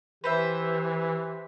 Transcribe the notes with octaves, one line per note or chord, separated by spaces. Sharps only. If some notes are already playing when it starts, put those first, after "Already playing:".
E3 G4 B4 C5 E5